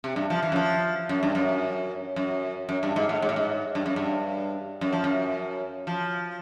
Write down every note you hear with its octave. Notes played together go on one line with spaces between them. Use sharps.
C3
G2
F3
E3
F#2
F3
F#2
G2
F#2
F#2
F#2
G2
G#2
A2
G#2
A2
G#2
G2
F#2
G2
F#2
F3
F#2
F3